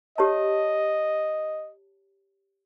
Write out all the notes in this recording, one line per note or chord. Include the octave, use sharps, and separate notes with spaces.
G4 C#5 D#5 A5